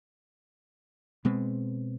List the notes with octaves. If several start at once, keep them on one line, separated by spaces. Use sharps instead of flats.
B2 G#3 B3 C4